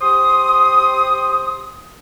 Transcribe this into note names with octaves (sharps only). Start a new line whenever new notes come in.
G4 C5 C6 D#6